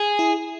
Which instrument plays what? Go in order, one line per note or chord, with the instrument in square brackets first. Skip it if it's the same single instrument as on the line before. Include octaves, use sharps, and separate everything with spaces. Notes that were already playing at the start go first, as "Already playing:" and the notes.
Already playing: [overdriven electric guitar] G#4
[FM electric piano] E4